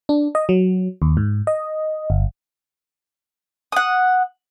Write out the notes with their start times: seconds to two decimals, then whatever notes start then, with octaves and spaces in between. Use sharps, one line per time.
0.09 D4
0.35 D#5
0.49 F#3
1.02 D#2
1.17 G#2
1.47 D#5
2.10 G1
3.72 F#5 D#6